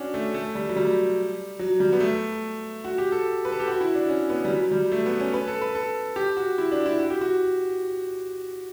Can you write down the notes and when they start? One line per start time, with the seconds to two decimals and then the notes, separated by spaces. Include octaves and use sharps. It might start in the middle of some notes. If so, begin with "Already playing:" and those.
Already playing: C#4 D4 F#4
0.14 A3
0.34 A3
0.55 G3
0.69 F#3
0.76 G3
1.59 F#3
1.80 G3
1.93 B3
2.00 A3
2.84 F#4
2.98 G4
3.12 A4
3.45 B4
3.52 A4
3.59 G4
3.68 F#4
3.81 E4
3.95 D4
4.09 C#4
4.30 B3
4.45 G3
4.51 F#3
4.71 G3
4.92 A3
5.06 B3
5.20 C#4
5.34 B4
5.47 A4
5.62 B4
5.75 A4
6.16 G4
6.37 F#4
6.58 E4
6.72 D4
6.86 E4
6.99 F#4
7.10 G4
7.21 F#4